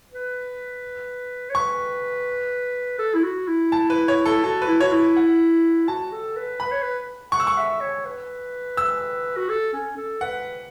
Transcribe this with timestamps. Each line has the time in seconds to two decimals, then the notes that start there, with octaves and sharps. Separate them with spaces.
0.11 B4
1.50 C#5
1.55 B4 C#6
2.99 A4
3.14 E4
3.23 F#4
3.47 E4
3.72 A5
3.90 B4
4.08 C#5
4.26 A4
4.44 F#4 A4
4.62 B4
4.67 E4
4.80 F#4 C#5
4.92 E4
5.16 F#5
5.88 F#4 A5
6.12 A4
6.36 B4
6.60 B4 B5
6.71 C#5
6.82 B4
7.32 F#5 C#6
7.40 E6
7.47 C#6
7.57 E5
7.81 C#5
8.05 B4
8.77 E6
9.37 F#4
9.49 A4
9.73 C#4
9.97 A4
10.21 B4 F#5